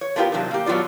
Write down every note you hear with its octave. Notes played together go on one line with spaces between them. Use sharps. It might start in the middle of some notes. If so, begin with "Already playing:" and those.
C#5
A3 B3 D4 F4 G4 A#4
C3 F#3 D4 D#4
A#3 G4
B2 F#3 B3 F4 D5